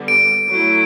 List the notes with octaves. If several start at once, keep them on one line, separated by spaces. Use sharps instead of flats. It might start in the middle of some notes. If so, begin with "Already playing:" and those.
Already playing: D3 G3 B3
D7
F#3 A3 E4